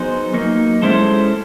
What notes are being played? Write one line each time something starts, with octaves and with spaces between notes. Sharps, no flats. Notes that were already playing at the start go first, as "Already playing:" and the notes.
Already playing: F#3 B3 D#4 G#4 C5
F#3 A#3 D#4
G#3 C#4 E4 A4 C5